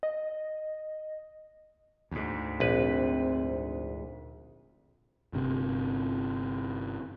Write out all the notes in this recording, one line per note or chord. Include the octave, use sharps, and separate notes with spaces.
D#5
D2 G#2
A#1 C4 B4
G1 C3